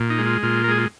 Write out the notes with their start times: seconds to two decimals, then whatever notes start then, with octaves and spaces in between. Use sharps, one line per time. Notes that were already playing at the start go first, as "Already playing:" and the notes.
Already playing: A#2
0.10 D#4
0.19 G#3
0.26 F4
0.43 A#2 F4
0.64 A#4
0.68 G#3 G#4
0.78 F4